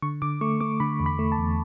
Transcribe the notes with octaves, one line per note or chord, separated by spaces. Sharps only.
D3 C#6
D3 D6
A3 C#6
A3 D6
D3 B5
E2
B5
A3
A5
E2